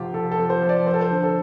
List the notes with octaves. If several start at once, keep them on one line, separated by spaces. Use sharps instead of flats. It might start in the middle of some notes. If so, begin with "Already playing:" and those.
Already playing: F1 F2 F3 F4 G4
F1 A4
A4
F2
C5
F3
D5
F2 C5
A4
C5
D3
A4